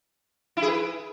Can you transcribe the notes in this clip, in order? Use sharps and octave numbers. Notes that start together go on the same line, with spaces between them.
E4
G#4
B4